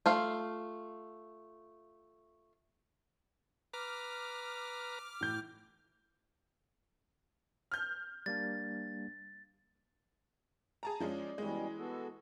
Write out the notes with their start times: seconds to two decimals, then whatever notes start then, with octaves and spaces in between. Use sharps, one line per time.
0.06 A3 F4 F5
3.73 B4 A#5 D6 F6
5.21 A2 E3 G6
7.72 F6 G6
8.26 G3 A#3 D4 A6
10.83 G#4 A5 A#5
11.00 F3 G#3 C#4 D5
11.38 B2 E3 G3 G#3 C#4
11.78 B3 F#4 A4